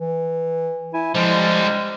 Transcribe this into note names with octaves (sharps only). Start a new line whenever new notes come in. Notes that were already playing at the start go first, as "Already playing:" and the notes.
E3
E4 G#5
D3 F3 G3 G#3